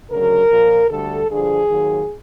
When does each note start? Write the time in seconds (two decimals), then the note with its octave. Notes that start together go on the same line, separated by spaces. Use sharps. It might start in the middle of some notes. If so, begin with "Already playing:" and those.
0.11 D2 C#3 F#3 A#4
0.50 A#2 F3
0.90 D2 D3 G3 A4
1.30 G2 D3 F3 G#4
1.70 D#2 D#3 F#3